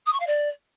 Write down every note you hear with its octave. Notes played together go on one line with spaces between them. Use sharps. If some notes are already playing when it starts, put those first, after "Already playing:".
D#6
C#6
F5
D5